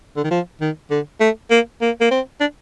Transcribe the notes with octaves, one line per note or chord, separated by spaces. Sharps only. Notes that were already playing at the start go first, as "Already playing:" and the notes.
D3
D#3
F3
D#3
D3
A3
A#3
A#3
A#3
C4
D4